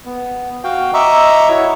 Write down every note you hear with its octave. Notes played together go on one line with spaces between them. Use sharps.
B3
F#4 F5 G5
D#5 E5 A#5 C#6 D6 E6
E4 F#4 C#5 C#6